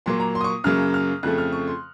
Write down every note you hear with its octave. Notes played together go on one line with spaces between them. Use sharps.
A#2 F#3 A#3 C6
A#5
C6
D#6
C#6
F#2 C#3 F#3 A#3 F6
F6
F2 C#3 F3 A3 F#6
F6
C#6
C6